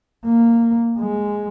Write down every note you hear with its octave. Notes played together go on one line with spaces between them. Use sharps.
A#3
G#3